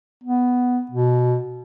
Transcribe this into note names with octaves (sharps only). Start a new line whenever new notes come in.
B3
B2